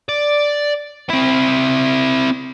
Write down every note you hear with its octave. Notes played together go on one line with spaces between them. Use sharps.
D5
C4 E4